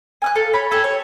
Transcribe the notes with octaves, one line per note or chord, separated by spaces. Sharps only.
G#5 F6 F#6
A4 F5
C#5 B5
G4 A4 G#5
C#5